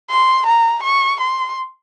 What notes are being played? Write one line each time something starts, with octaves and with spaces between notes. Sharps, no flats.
C6
A#5
C#6
C6